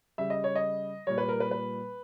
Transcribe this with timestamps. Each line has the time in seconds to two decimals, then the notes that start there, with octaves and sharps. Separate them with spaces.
0.18 C#3 G3 E5
0.30 D#5
0.44 C#5
0.56 D#5
1.07 A#2 G3 C#5
1.18 B4
1.28 A#4
1.40 B4
1.51 B4